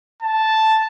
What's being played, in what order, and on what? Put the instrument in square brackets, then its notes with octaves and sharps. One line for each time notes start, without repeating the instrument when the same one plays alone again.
[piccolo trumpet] A5